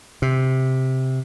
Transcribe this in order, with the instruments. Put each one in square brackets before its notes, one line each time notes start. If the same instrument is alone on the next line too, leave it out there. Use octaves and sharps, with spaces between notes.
[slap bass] C3